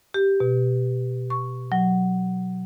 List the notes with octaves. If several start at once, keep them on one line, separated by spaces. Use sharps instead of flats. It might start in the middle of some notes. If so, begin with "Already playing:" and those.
G4
B2
C#6
F#3